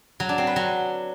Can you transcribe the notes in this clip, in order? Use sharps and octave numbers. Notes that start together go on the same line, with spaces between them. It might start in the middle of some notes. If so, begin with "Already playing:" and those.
F#3
D4
C4
B4
F#3